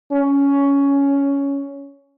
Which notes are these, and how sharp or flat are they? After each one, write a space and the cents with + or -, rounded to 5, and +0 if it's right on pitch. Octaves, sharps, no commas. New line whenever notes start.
C#4 +10